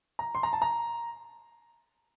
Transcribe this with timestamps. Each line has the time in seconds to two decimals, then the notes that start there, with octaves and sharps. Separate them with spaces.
0.19 A#5
0.35 C6
0.43 A#5
0.53 A5
0.62 A#5